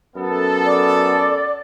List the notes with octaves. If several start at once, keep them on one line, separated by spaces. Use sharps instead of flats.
F#2 B3 A4
D5